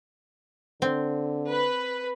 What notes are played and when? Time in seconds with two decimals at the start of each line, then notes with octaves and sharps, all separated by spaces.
0.82 D3 C4
1.49 B4